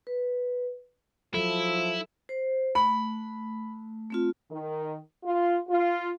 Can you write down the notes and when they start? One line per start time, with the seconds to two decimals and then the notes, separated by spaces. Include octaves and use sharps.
0.07 B4
1.34 F3 F#3 E4 A4
2.29 C5
2.75 A3 B5
4.11 A3 C4 F4
4.51 D#3
5.24 F4
5.68 F4